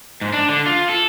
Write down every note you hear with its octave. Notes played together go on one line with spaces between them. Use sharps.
G#2
D4
D3
F4
A4